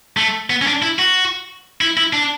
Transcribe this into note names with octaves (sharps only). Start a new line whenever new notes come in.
A3
B3
C#4
D4
E4
F#4
E4
E4
D4